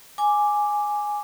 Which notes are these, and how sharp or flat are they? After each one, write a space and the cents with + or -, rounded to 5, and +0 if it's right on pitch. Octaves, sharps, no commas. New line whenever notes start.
G#5 +0 D6 +0